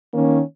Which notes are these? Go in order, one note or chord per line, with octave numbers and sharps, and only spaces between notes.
D#3 A#3 C#4